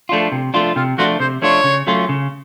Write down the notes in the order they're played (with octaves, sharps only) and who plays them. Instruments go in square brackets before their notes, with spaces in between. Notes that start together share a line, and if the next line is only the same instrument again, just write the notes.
[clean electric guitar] F3 A3 D4 F4
C3
F3 A3 D4 F4
[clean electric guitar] C3 [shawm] F4
[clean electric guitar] F3 A3 D4 F4 [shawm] F#4
[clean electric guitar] C3 [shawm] C5
[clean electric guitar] F3 A3 D4 F4 [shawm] C#5
[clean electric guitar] C#3
F#3 A3 C#4 F4
C#3